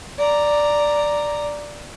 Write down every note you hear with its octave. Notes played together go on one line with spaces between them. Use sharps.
D5 A#5